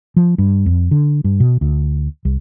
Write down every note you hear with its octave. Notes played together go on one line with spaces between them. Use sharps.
F3
G2
F2
D3
G2
B2
D2
C2